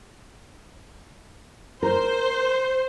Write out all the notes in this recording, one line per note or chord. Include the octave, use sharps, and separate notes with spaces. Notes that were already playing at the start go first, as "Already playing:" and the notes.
A#4 C5